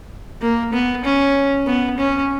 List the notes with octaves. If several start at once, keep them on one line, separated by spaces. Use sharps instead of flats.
A#3
B3
C#4
B3
C#4